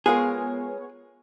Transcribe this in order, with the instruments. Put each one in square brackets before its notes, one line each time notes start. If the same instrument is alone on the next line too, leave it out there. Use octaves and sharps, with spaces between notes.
[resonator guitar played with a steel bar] G#3 F4 A#4 [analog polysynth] B3 C#5 [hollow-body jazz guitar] G#4